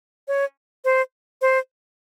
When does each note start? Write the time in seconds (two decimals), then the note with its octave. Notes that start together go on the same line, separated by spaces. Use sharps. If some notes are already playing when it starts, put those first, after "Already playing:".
0.28 C#5
0.85 C5
1.42 C5